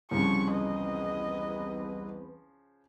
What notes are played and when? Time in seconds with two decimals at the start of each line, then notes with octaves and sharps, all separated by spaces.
0.11 C2 C#3 F3 C#6
0.52 E2 C4 B4 D#5